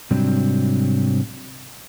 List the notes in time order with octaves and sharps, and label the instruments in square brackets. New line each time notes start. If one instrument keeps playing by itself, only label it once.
[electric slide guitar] G#2 C3 F#3 G3 C4 D4